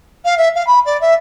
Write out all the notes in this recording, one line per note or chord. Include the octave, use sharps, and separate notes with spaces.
F5
E5
F5
B5
D5
E5